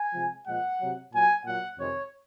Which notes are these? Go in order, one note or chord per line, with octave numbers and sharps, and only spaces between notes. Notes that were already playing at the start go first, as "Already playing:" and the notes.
Already playing: G#5
C3 F3 G#3
A#2 F3 G#3 F#5
C3 F#3
A#2 F#3 G#5
A#2 F#3 F#5
F2 C3 D#3 G#3 C#5